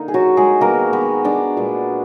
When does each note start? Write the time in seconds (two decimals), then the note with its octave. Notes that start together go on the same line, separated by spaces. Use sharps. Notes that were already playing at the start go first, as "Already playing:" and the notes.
Already playing: D3 A#3 D#4
0.08 G#4
0.14 F#3 F#4
0.37 G#3 G#4
0.61 D#3 G#3 A#3 B3 A#4
0.93 B3 B4
1.24 D4 D5
1.57 A#2 G#3 B3